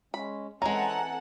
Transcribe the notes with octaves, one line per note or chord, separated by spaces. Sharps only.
G#3 C#4 B5
E3 G#3 C4 C#4 A4 F#5 G#5 A#5